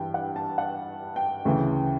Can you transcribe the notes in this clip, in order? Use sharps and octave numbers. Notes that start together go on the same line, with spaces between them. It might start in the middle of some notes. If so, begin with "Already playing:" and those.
Already playing: G2 E3 G3 G5
F#5
A5
F#5
G5
D2 C#3 E3